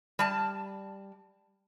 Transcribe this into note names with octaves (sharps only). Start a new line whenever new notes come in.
G3 A5